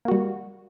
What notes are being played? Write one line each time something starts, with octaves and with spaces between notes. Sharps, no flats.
G3 A#3 F#4